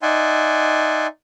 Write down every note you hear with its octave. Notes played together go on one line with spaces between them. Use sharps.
D#4 D5 E5 F#5 G#5 C6